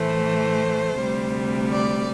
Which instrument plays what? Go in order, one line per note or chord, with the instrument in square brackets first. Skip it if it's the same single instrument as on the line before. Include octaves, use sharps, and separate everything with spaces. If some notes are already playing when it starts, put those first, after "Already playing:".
Already playing: [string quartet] A2 E3 A3 C5
D2 C3 G3
D5